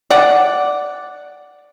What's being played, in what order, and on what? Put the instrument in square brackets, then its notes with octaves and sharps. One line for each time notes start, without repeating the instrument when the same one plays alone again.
[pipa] D5 F#5